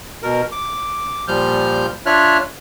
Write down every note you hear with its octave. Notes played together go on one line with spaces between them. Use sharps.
B2 A#4
D6
A#2 F3 G3 F6 G6
D4 F4 C#5 E5 F6 F#6